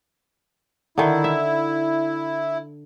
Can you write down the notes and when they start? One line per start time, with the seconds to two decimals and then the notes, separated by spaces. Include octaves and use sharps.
0.98 D3 D#3 E4
1.24 E5